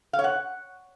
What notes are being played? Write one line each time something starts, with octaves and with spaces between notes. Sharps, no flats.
F5
C#5
F#5